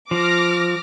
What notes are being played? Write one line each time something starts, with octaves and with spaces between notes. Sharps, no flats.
F3 D6 F6 A#6